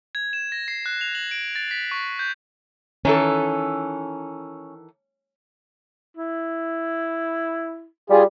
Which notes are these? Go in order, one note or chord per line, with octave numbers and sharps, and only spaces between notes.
G#6
E7
A#6
C7
F#6
F7
F#7
D7
A6
B6
C#6
G6
D#3 E3 C#4 A4
E4
G3 F4 G#4